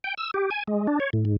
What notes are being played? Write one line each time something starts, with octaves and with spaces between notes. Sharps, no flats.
G5
E6
G4
G#5
G#3
D4
C#5
A2
G#2